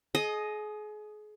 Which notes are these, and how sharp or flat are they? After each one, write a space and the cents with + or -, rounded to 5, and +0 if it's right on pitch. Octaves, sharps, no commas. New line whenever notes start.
G#4 +35 D#5 +0